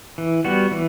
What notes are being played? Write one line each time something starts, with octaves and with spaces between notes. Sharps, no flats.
E3
G3 B3 F#4
E3